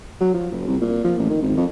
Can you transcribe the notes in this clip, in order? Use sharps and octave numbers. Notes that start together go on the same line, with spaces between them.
F#3
F3
F#1
C2
A#2
F3
A1
D#3
G#1
F2